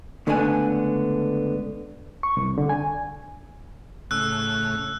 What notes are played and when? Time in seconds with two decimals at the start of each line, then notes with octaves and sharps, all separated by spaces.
0.27 C#2 D3 A3 B3 D4 G#5
2.23 C#6
2.37 C2
2.58 D3
2.69 G#5
4.11 A2 C#3 E6 F#6